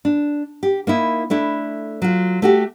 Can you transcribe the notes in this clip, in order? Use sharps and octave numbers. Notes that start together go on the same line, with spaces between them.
D4
G4
A#3 D#4 E4
A3 D4 E4
F#3 F4
A3 F#4 G4